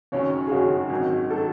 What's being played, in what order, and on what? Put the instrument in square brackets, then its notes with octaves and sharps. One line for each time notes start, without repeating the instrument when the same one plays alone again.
[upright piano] F#1 F#2 D#3 F#3 C#4 [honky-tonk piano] C#5
[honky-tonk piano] G#4
[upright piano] F#1 F#2 D#3 F#3 C#4 [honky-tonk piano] F#4
[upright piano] G#1 G#2 D#3 F#3
[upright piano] D#3 F#3 [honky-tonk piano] A4